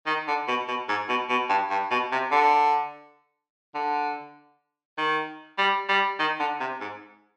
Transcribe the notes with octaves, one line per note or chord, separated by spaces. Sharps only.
D#3
D3
B2
B2
G#2
B2
B2
G2
G2
B2
C3
D3
D3
D#3
G3
G3
D#3
D3
C3
G#2